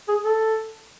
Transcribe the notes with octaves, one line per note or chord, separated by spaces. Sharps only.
G#4
A4